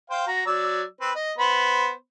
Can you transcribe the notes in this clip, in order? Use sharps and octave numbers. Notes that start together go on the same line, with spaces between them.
C5 F5 G5
F#4 A#5
F#3 D5 E6
C4 B4
D#5
B3 C5 B5